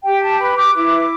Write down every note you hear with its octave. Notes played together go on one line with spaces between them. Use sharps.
G4 G5
A5
B4 B5
D6
E4 D6